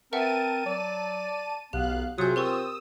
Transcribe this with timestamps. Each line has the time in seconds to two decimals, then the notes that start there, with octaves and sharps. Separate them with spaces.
0.13 C4 A#4 B4 E5 F#5 A5 D#7
0.66 F#3 D5
1.73 B1 B3 G4 F5 F#6
2.18 C3 F#3 F4 G#4 D#6 G6
2.36 C4 G4 A#4 C#6 D#6 E6